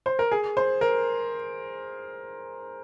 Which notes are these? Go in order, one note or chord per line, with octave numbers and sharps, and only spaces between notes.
C5
A#4
G#4
C5
A#4